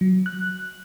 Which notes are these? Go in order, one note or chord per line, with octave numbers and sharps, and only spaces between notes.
F#3
F#6